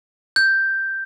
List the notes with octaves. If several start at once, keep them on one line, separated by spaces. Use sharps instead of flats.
G6